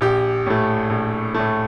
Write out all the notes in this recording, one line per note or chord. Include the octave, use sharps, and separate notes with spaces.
A#1 G4
A2 A3
A#1
A2 A3